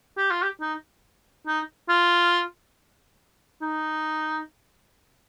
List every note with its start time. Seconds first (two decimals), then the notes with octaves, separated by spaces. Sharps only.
0.17 G4
0.30 F4
0.42 G4
0.61 D#4
1.47 D#4
1.89 F4
3.61 D#4